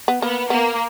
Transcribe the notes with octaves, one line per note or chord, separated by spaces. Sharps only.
B3
A#3 B3
A#3 B3